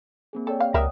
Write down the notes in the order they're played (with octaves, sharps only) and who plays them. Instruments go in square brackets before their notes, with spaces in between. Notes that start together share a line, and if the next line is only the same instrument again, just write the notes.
[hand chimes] A#3 C4 G#4
[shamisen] A4 [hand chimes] C#5 D5 G5
[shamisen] F5
[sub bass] C#2 [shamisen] G3 A#4 E5 [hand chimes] D#5 F#5 D#6